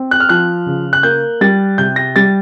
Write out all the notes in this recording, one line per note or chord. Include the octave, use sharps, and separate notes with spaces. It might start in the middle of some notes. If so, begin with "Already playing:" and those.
Already playing: C4
F#6
F6
F3 F#6
C#3
F#6
A#3 G6
G3 A6
C3 G6
A#6
G3 A6